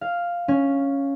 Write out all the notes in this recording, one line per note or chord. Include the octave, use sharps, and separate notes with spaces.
F5
C#4